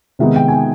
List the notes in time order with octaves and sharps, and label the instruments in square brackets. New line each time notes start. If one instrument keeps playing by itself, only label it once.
[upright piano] C3 D#3 G#3 B3 D#4 E5
G5
G#5
G5